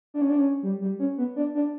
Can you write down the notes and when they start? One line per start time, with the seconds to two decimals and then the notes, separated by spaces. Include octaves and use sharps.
0.14 D4
0.21 C#4
0.30 D4
0.38 C#4
0.63 G3
0.81 G3
0.99 C#4
1.18 B3
1.36 D4
1.55 D4